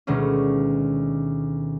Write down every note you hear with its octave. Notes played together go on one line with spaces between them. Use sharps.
D2 B2 D#3 G#3 C#4